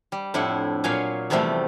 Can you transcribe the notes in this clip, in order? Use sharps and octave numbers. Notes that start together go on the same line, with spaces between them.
G3
F2 A2 D4 E4 F#5
A#2 F#3 C#5 F5 G#5
E2 C3 F3 G3 A3